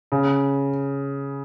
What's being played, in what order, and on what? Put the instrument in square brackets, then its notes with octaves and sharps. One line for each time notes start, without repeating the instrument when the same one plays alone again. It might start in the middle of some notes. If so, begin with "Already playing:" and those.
[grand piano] C#3